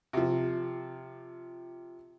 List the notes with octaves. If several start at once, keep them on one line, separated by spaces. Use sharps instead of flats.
C3 F3